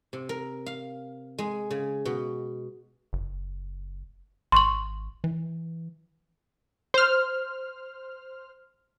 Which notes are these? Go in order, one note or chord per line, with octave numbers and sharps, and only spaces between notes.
C3
A#4
F5
G#3
C#3
B2
F#1
G#1 C6 C#6 F#7
E3
C5 F6